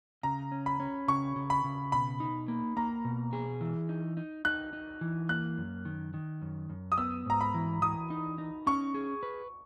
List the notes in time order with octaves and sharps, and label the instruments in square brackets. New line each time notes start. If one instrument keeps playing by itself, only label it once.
[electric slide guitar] C#3 [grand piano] A#5
[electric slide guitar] C#4
[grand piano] B5
[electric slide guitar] C#4
[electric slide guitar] C#3 [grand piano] C#6
[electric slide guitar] C#3
[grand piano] B5
[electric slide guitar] C#3
[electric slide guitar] B2 [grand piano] B5
[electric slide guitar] D#4
A#3
[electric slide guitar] A#3 [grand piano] A#5
[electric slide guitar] B2
G#4
E3
D#4
D#4
[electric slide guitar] D#4 [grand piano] F#6
[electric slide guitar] D#4
E3
[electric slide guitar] A#3 [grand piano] F#6
[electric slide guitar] F#2
D#3
D#3
F#2
F#2
[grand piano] D#6
[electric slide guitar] B3 [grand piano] E6
[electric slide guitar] G#2 [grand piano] A#5
[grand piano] B5
[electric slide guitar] E3
[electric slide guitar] E3 [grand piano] D#6
[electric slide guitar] D#4
D#4
[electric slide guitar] C#4 [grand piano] C#6
[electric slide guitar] G#4
B4